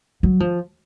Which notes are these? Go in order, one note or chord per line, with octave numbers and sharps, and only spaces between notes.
F#3
F3